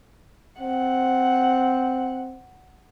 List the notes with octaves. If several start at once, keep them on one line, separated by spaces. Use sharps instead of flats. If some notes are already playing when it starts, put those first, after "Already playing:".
C4 F#5